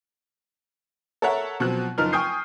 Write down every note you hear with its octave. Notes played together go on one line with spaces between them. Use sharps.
A4 A#4 C#5 E5 F#5 A#5
B2 F3 F#3 C4 F#6
F#1 F3 D#4 F4 A#4 F6
G5 G#5 C#6 D#6 G6 C7